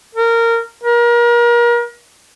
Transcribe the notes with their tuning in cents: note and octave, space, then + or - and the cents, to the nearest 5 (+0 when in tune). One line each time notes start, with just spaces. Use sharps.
A#4 -15
A#4 +35